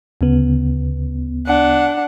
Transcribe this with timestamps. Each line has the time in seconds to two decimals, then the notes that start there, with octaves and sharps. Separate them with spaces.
0.21 D2 C#3 B3
1.46 D4 F#5